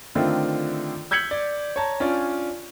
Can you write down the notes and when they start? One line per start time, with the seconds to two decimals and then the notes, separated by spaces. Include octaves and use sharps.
0.15 D3 D#3 A3 C4 D4 F4
1.11 E6 G6 G#6 B6 C#7 F#7
1.31 D5
1.76 C#5 A5 A#5
2.00 C#4 D4 F4 D5